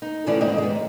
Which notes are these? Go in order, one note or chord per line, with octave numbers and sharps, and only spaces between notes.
D#4
A2 D3 E3 C#4 D5
D#2 G#2 C4 D#5
G#3 B3
F#2